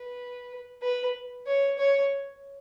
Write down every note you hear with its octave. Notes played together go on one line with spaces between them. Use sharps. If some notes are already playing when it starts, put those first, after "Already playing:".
Already playing: B4
B4
C#5
C#5